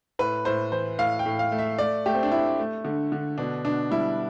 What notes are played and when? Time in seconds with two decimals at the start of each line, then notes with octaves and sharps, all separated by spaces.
0.19 A2 B4
0.45 A2 C5
0.72 E3 C5
0.99 A2 F5
1.19 G5
1.26 A2
1.39 F5
1.52 A3
1.59 E5
1.78 A3 D5
2.06 A3 G4
2.15 C4
2.23 D4
2.32 A3 E4
2.59 A3
2.85 D3
3.12 D3
3.38 B2 D4
3.65 B2 D4
3.91 G3 E4